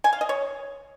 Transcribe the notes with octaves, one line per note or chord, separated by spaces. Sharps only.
G#5
F5
D#5
C#5